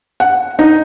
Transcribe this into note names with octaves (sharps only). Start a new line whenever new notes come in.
F#5
D#4